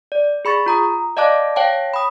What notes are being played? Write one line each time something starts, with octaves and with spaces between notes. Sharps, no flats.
D5
G#4 B5 C#6 A6
F4 A#5 D#6
D5 D#5 F5 A5 D6 F#6
C#5 F5 G5 A5
B5 D#6